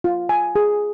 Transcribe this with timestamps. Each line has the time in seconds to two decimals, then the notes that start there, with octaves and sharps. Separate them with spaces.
0.04 F4
0.29 G#5
0.56 G#4